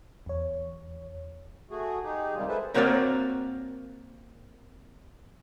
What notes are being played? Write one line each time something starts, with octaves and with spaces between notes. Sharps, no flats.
E2 C#5
A3 F#4 G#4
D#4 G4 G#4
C3 D#3 G3 G#3 F4
G#4 A4 B4 C5 E5 A5
A#3 C4 F#4 A#4 C#5 D5